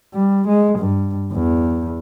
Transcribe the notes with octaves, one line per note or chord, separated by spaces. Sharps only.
G3
G#3
G2
E2